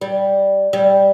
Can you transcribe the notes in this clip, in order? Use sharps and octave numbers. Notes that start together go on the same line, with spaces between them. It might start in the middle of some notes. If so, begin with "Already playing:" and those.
G3
G3